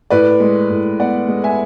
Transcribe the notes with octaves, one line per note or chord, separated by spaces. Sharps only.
A2 B4 D5
G#3
A2
B3 D5 F#5
G#3
E5 G#5